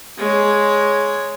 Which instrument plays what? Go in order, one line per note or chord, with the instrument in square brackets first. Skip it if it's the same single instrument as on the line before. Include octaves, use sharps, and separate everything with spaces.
[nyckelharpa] G#3 C#5